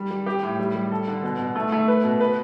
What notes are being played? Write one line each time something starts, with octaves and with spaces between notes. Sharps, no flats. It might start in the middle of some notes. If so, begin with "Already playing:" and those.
Already playing: G3
G3
G4
A2
G3
G3
A4
D3
B2
B2
A3
A3
B4
B2
B4